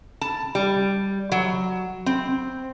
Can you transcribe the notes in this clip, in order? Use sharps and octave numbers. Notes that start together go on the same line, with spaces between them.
A5
G3
F#3
C4